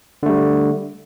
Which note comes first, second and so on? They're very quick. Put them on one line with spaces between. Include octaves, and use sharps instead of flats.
D3 A3 G3